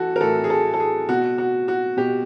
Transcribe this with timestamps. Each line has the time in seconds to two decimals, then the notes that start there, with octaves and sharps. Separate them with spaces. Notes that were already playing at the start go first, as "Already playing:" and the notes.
Already playing: E3 F#4 A4
0.16 A#4
0.20 A2 E3 A4
0.44 G#4
0.50 A4
0.74 A4
0.80 G#4
1.09 B2 F#4
1.38 F#4
1.68 F#4
1.97 B2 G4